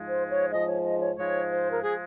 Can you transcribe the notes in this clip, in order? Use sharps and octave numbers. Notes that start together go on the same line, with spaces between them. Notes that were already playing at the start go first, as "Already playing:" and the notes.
Already playing: G#2 F3 G#3
C5
C#5
G#2 F3 G#3 D#5
C#5
D#5
C#5
G#2 F3 G#3 C#5
C5
A#4
F3 G#3 G#4